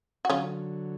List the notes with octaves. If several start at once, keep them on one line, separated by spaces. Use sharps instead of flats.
F#4
D3 F#3 C#4 F4